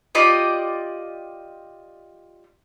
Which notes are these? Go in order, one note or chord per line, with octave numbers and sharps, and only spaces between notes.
F4 G4 D5 D#5